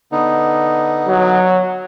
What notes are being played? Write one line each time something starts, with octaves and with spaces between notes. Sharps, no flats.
D3 B3 D#4
F#3